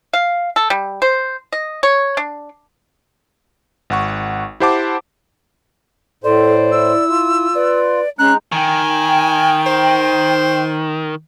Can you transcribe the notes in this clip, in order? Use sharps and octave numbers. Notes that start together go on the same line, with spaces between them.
F5
A4
G3
C5
D#5
C#5
D4
G#1 F#5 C#6
E4 G4 C5 F#5 A5 D6
A2 A4 C5 D5
E4 E6
F4
B4 D5
G#3 C#4 D#4 A#5 F#6
D#3 G5 G#5
C5